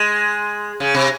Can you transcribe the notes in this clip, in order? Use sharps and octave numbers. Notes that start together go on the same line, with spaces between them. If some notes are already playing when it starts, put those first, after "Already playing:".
Already playing: G#3
C#3
C3